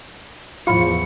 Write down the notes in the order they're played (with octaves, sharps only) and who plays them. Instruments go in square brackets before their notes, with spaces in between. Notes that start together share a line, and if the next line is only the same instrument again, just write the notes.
[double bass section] E2 F3 [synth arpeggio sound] A2 F4 [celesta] F5 B5 [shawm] C#6